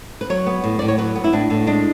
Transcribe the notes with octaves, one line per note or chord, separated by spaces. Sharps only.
B4
F#3 C#5
B3
A2
A2 D5
C#5
F#3 B4
B3
E4
A2 D4
A2
G#3 D4